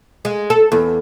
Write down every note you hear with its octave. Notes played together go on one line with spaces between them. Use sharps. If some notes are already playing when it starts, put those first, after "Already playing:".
G#3
A4
E2